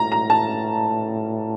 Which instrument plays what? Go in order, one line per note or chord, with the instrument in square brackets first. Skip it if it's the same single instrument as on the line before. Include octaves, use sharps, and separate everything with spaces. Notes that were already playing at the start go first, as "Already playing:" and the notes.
Already playing: [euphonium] A2 [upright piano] A#5
[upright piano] A#5
A5